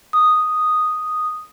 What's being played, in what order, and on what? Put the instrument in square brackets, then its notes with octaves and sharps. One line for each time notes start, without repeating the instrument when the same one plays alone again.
[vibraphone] D#6